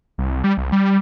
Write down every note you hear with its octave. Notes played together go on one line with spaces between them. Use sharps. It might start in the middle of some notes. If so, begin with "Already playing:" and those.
C2
G3
C2
G3